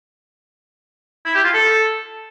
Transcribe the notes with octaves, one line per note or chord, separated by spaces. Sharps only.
E4
G4
F4
A4